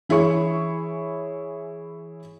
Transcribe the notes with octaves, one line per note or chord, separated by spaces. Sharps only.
E3 E4 G#4 C#5 C#6